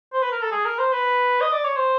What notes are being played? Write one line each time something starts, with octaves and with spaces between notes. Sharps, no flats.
C5
B4
A#4
A4
G#4
A#4
C5
B4
D#5
D5
C#5
C5